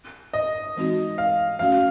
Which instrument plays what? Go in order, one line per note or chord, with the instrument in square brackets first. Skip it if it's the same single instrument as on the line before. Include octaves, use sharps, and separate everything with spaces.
[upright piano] D#5
[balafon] E3 G#3 C4 D#4 F#4
[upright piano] F5
[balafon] F3 A3 C#4 F#4 [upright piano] F5